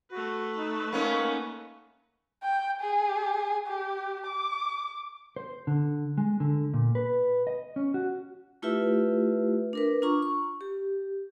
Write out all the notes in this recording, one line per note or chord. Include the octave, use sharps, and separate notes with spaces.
A3 F#4 B4
D#4
A#3 B3 C#4 D#4
G5
G#4
G4
D6
C5
D3
G#3
D3
A#2
B4
D#5
C#4
F#4
A3 E4 F4 G4 B4 E5
D4 A#4 B4
D4 F4 A#5 C#6
C#6
G4